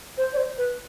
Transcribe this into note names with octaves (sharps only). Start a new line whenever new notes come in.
C5
D5
C5
B4